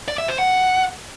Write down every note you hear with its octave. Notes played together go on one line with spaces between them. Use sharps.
D5
E5
C5
F#5